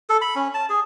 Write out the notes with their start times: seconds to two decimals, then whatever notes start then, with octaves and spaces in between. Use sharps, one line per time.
0.10 A4
0.22 B5
0.36 C#4
0.54 A5
0.70 G#4